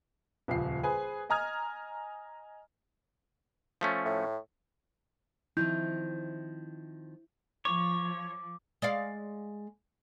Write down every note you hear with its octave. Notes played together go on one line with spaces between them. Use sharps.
D#1 C#2 F3 C7
G#4 B4 C5 G#5
D#5 G#5 A#5 D#6 F6 G#6
F3 A3 C#4
A2
D#3 F3 C4 E4 G6
F3 C#5 D6
G#3 D5 F5